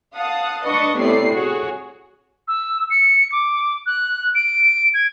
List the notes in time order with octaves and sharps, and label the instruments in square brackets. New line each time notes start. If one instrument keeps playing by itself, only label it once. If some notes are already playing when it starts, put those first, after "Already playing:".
[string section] F5 F#5 A5 D#6
D4 B4 D#5 A5 C#6 D#6
A2 C3 G3 B3 D5 C7
F#4 G#4 C#5
[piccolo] E6
C#7
D6
F#6
D7
G#6